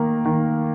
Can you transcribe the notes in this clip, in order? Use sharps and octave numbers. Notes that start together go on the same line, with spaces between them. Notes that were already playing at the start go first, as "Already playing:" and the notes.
Already playing: D#3 A#3
D#3